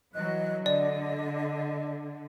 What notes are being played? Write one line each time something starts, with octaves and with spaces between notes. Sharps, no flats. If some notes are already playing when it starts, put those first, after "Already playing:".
E3 F#3 D#5 F#6
D3 D5 D#5